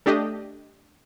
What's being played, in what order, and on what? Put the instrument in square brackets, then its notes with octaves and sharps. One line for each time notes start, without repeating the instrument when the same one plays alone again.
[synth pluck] A3 D4 G4 D#5